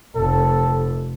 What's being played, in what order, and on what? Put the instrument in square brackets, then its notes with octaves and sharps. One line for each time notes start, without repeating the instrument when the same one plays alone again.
[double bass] F1 [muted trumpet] A4